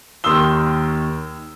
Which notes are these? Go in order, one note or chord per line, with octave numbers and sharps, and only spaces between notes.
D#2 D#3 C6 D#6 E6 G7